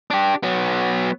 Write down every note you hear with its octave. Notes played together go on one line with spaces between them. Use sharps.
D4 G4
F#3 B3